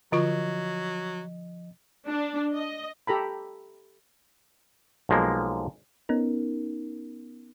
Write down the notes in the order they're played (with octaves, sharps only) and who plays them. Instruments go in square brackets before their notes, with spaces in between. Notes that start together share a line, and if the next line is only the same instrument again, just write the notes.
[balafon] D3 F4 C#6 [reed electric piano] F3 D#5 [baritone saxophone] F#3
[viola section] D4
D#5
[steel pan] G4 A4 A#5 B5
[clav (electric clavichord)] B1 F3 G#3 A#3
[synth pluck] B3 C#4 D#4 A#4